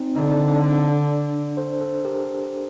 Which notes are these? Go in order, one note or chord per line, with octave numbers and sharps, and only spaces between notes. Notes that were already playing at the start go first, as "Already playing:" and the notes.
Already playing: C4 D#4
D3 D#4
D4
C4
D4
A4 C5
A4 C5
G4 A#4